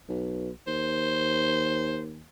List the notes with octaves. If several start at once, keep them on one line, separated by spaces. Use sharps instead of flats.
B1
D#2 C5